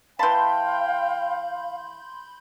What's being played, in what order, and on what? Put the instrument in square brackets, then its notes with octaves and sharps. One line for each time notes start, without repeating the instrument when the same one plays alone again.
[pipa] E3 A5 [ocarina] F5 [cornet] G5 [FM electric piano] B5 C6 G6